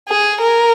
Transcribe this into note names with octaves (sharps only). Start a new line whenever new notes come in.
G#4
A#4